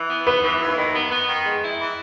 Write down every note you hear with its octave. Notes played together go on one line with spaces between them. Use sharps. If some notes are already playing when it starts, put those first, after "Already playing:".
Already playing: E3
B3
B3 B4
E3
D#2
D#3
B3
B3
D#3
G#3
E4
E3